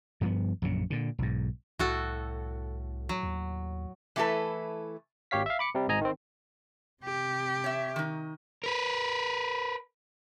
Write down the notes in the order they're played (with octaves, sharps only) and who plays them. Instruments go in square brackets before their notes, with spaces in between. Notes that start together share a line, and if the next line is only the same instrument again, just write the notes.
[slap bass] G2 F3 A#3 B3
A#1 F#2 C#3
A#2 D3
B1 G#2
[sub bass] C2 [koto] A2 F#4 A4
[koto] F#3
[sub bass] D#2
[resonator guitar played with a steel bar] E3 A3 E4 F#4 A4 B4
[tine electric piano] G#1 G4 C#5 F5 B6
E5 F5
B5 D6 C#7
C3 G3
G#1 G#2 D#5 G#5 A#5
D#3 C4
[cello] C3 G4
[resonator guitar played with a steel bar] C#5 E5
D#3 D#4
[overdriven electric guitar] A#4 B4